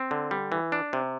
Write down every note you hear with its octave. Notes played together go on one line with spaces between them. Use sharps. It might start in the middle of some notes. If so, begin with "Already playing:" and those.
Already playing: C4
D3
G3
E3
D4
C3